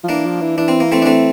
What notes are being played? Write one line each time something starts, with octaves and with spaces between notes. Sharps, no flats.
F3
E3 A#3 D4
F3
E3
E3 D4
C4
A#3
A3 C4
D4
A3 C4